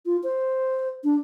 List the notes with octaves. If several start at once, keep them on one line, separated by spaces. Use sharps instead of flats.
F4
C5
D4